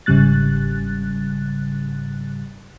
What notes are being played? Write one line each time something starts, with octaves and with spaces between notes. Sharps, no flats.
G1 G#2 C#3 G3 F#6 A6